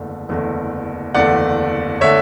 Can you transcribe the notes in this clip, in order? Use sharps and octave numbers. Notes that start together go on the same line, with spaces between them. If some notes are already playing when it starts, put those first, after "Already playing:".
Already playing: F#1 E2 D3 A3
F#1 E2 D3 A3
F#1 E2 D3 A3 D5 F#5
D3 A3 C#5 E5